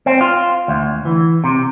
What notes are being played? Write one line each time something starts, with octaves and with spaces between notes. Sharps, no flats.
C4
F4
D2
E3
C3